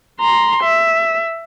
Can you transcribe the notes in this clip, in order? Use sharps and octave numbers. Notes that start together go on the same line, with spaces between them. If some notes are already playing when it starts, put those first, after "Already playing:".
A#5 C6
E5